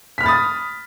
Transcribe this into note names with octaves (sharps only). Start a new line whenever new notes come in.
B5 D#6 F6 A6 B6